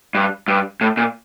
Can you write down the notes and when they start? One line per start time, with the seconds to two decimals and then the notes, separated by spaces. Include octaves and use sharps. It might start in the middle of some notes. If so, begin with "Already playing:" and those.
0.15 G2
0.48 G2
0.81 A2
0.97 A#2